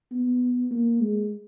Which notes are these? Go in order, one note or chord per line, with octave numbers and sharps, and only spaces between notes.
B3
A#3
G#3